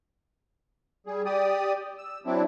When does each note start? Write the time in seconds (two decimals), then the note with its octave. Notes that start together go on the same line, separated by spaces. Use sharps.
1.07 G3 G#4
1.25 G4 D5 D#6
1.98 E6
2.26 F#3 C4 D4 E4